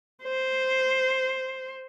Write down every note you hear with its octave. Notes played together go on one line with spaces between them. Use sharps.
C5